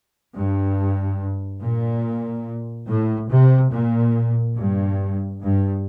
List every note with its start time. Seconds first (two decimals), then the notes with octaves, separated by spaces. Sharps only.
0.35 G2
1.61 A#2
2.88 A2
3.30 C3
3.71 A#2
4.55 G2
5.40 G2